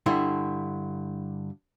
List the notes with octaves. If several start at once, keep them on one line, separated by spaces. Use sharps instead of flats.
G2 D3 E4